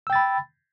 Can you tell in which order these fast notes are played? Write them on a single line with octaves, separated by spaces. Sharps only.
E6 G5 A6 B5